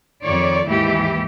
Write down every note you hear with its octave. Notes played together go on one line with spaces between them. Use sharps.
F2 D#3 C#5 D5
D#2 G#2 E3 E4 G4